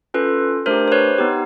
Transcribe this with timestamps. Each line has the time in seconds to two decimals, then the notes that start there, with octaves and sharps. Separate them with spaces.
0.14 C#4 F4 A4 B4
0.66 A3 D4 G4 A#4 C5
0.88 C5
0.92 B4 C#5
1.18 B3 D#4 G4